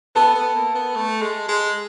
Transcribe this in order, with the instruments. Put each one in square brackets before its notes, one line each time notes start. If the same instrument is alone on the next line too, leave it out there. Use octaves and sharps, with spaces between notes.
[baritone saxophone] B3 [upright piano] A4 A5
[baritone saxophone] B3
A#3
B3
A3
G#3
G#3